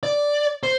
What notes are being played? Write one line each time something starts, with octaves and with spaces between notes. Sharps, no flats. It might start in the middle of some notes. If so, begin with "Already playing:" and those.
D5
C5